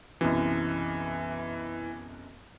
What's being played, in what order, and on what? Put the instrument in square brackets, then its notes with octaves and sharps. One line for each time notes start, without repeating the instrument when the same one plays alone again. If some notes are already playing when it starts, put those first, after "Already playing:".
[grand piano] B1 F#2 C3 [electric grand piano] E3